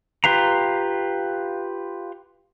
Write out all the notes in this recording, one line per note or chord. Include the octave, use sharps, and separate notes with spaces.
F4 G4 B4 F5 A#5